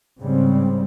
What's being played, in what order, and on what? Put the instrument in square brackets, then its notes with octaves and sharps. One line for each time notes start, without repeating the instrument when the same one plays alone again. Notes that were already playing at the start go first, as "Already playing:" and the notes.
[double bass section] G#2 C#3 G3 C4